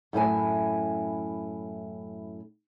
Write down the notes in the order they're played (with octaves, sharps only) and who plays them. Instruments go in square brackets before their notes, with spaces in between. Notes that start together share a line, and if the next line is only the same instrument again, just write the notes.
[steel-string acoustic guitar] F#2 A2 E4 G#5